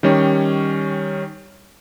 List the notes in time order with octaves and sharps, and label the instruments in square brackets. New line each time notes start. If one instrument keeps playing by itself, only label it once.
[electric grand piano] D#3 G3 C#4